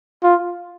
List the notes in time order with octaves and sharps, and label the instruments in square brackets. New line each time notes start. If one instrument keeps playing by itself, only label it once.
[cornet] F4